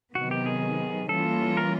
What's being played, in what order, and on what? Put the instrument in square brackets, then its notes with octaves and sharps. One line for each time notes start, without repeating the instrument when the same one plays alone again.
[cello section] C3 D#3 F#3 B3 [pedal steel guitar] F#4
[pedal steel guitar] G4
G#4
[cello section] E3 G3 A#3 C#4 F4 [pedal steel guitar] A4
[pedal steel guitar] A#4